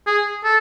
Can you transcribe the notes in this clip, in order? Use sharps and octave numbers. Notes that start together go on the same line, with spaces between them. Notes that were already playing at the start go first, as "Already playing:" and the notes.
G#4
A4